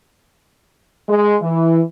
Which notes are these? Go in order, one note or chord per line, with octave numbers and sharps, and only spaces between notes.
G#3
E3